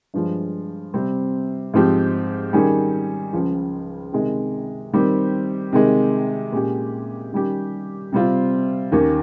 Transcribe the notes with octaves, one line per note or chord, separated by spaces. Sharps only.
G2 F3 G#3
C3 G3 C4
G#2 F3 C4 G4
D#3 G3 C#4 G#4
C#2 C#3 F3
C3 D#3 G#3
D#3 G3 C4 G4
C3 D#3 G#3
A#2 G#3 C#4 G4
D#3 G3 C#4 G4
C3 G3 C4 F4
D#2 D#3 A#3 C#4